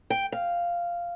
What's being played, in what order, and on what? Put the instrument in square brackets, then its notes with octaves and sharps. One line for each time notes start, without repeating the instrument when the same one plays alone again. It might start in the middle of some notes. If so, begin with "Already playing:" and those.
[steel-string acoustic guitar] G5
F5